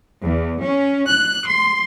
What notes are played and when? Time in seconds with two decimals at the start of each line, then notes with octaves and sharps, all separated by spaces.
0.25 E2
0.62 C#4
1.08 F#6
1.46 C6